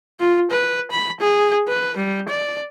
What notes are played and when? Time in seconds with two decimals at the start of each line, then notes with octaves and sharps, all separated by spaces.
0.20 F4
0.51 B4
0.91 B5
1.20 G#4
1.68 B4
1.97 G3
2.29 D5